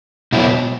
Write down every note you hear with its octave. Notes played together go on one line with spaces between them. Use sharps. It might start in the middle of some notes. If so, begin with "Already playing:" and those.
B2 F#3 E4